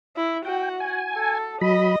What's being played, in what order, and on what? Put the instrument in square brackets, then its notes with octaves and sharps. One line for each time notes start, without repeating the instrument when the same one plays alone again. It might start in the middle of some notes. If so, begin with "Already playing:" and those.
[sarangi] E4
[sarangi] F#4 [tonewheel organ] G5
[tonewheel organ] G#5
[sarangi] A4
[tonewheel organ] F#3 B5 [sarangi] D#5